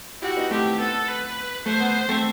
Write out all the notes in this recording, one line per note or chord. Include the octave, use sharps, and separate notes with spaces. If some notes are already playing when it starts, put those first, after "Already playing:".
E4 F#4 G4
B3 D#4
A3 C4 G4
B3 A4
B4
A3 C5
B3
A3 C4